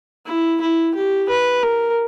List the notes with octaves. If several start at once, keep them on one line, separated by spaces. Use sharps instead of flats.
E4
E4
G4
B4
A#4